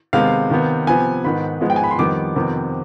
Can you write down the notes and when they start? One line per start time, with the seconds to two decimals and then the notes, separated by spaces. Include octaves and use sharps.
0.13 C3 D#3 G#3 B3 F5
0.50 C3 D#3 B3
0.87 C3 F3 B3 G#5
1.24 G#2 D#3 B3 B5
1.61 G#2 F3 G#3 B3
1.70 G5
1.76 G#5
1.84 B5
1.91 C6
1.98 F2 D#3 G3 B3 D6
2.36 F2 C3 D#3 B3